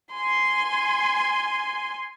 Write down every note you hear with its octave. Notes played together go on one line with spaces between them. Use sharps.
G#5 C6